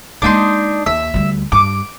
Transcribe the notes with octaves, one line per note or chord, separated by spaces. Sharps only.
G#3 A#3 D4 D#4 C6
D#2 E5
D2 G3
G2 D6